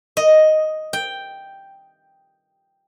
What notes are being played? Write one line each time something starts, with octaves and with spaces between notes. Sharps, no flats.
D#5
G5